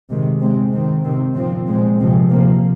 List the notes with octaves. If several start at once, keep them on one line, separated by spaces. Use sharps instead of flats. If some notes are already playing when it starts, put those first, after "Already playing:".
C3 D#3 G#3
C3 G#3 C4
G#2 D#3 C4
C3 D#3 C4
A#2 F3 C4
A#2 G#3 C4
C3 F3 G#3 C4
C3 F3 A#3